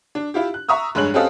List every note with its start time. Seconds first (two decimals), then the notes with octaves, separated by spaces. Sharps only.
0.15 D4
0.34 E4 F4 G4
0.54 F#6
0.69 E5 A#5 C#6 D#6 E6
0.95 F1 G2 G#3 C#5 F#6 F#7
1.14 C4 C#4 G4 A4 D#5 F5